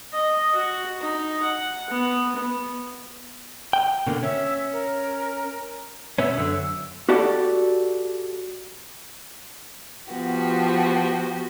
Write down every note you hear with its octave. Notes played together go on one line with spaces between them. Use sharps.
D#5
F#4
D#4
F#5
B3
B3
G5
B2 D3 A#3
C#4 E5
A#4
B2 B3 C#4 E5
F#2 D3 E6
F#4 G4 A4 D5 F#5
F3 B3 F#4 G4